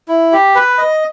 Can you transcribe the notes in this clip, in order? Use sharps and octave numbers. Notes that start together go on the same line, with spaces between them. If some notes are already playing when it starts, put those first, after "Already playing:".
E4
G4
B4
D#5